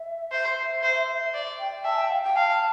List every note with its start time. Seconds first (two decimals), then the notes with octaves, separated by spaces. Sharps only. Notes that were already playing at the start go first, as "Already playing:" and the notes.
Already playing: E5
0.32 C5 E5
0.83 C5
1.34 D5
1.59 G5
1.85 E5 A5
1.98 G5
2.11 F5
2.23 G5
2.36 F5 A5